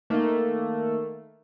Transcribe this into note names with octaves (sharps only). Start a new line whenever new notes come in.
D#3 A3 A#3